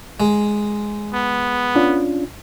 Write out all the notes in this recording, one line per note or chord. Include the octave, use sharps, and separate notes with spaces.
G#3
B3
C#4 D4 F4